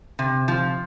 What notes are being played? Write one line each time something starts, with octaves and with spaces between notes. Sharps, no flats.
C3
F3